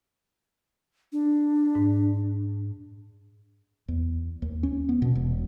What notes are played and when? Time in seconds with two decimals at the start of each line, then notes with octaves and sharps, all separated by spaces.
1.12 D4
1.75 G#2
3.88 E2
4.42 D#2
4.63 C#4
4.89 B3
5.02 B2
5.15 E1